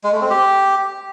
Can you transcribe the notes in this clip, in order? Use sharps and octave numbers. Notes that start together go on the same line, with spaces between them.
G#3
A3
C4
G4